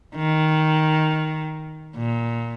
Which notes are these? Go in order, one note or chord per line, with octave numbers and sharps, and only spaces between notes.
D#3
A#2